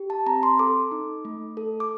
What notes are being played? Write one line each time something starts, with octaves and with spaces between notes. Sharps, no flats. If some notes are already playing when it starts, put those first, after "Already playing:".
Already playing: G4
A5
C4 A#5
C6
A4 D6
D#4
A3
A4
D6